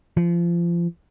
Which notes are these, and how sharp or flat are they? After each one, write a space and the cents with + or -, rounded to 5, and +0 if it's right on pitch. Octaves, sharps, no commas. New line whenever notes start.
F3 -30